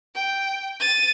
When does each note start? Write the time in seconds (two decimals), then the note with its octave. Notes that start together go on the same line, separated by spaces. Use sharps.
0.15 G5
0.80 A6 D#7